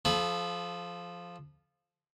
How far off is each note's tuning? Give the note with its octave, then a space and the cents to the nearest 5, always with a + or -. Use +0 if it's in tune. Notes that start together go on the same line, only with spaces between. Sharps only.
F3 +0 A4 -35 B5 +0